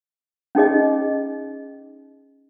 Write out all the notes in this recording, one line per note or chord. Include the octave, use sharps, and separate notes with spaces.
C#4 D#4 G#4 D#5